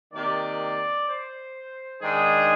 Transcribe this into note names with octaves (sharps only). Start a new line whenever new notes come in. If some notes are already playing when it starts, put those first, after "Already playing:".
C3 D#3 A#3 D5
C5
G#2 D#3 G#3 D4 G#4